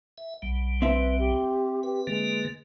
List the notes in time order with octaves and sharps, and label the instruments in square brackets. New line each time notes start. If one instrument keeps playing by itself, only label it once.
[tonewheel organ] E5
B1 G3
[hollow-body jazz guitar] C4 E5 [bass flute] B4
[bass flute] G4
[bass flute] G4 [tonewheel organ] B4
[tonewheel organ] D3 A#3 B4 [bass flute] G#3